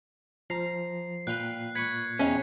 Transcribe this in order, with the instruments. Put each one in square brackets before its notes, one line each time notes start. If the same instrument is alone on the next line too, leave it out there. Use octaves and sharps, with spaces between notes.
[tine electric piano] F3 [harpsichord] A#5 [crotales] C7
[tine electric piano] A#2 [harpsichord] B4 F5 G5 [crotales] F#6
[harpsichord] B4 C#6 [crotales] G#6 B6 C#7
[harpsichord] E2 C3 D#4 [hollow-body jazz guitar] C#4